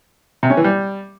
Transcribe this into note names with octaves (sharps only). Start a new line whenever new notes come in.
C3
C#4
E3
G3